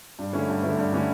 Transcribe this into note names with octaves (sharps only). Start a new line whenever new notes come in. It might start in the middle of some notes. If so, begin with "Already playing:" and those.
G2
D3 A3 C#4 E4
G2
D3 A3 C#4 E4
G2
D3 A3 C#4 E4